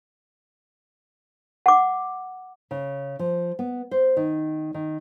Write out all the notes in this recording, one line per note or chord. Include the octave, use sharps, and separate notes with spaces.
F#5 D6
C#3
F3
B3
C5
D#3
D#3